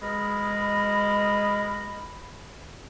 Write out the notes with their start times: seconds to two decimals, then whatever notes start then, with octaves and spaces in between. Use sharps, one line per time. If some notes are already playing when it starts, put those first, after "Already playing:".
0.02 B2 G#3 G#4 A#4 D#5 B5